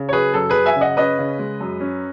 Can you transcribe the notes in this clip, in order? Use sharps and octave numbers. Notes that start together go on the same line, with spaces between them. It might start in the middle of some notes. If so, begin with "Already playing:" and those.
Already playing: C#3
C#5
F#3 G#4 B4
F#2 A4
G#4 B4
F#2
E5 G#5
C#3
D#5 F#5
C#4 B4 D#5
C#3
G#3
F#2
C#4